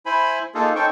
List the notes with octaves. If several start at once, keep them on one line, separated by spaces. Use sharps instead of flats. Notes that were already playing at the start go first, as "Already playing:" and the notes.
E4 C5 G#5 B5
A#3 D#4 F4 G#4 A4
C#4 D#4 A4 C5 G5 C#6